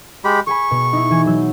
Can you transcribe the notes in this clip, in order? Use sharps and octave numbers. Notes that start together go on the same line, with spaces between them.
G#3 G4 B5
G#4 G#5 B5 C#6
B2
D#4 E4
E3 G#5 G#6
F#3 E6 G6